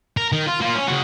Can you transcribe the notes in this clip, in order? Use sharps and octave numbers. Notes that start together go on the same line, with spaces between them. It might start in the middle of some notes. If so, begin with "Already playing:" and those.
A#4
D#3
F4
A#3 F4
C#4
C#3 F#4